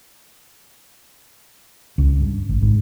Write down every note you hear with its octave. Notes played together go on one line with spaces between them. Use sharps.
C#2
G2
G#1
G#1 G#2